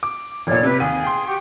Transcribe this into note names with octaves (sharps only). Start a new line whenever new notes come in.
D6
F1 A#2 C#5 D5 G#6
C3 B4
D#2 G#4 D#7
G5 C6
F#4 G4 C#6